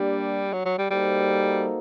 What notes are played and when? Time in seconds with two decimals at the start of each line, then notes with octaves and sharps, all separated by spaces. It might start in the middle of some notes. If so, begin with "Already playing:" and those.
Already playing: G3 A#3 D4 G4
0.53 F#3
0.65 F#3
0.78 G3
0.90 G3 A#3 D#4 F#4 A4 C5